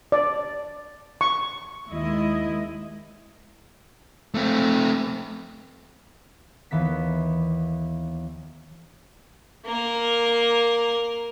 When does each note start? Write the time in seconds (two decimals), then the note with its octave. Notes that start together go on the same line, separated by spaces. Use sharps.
0.12 D5
1.21 C#6
1.90 D#2 G#3 E4 D#5
4.35 A3 C4
6.71 D#2 E3 B3 B6
9.66 A#3 A#4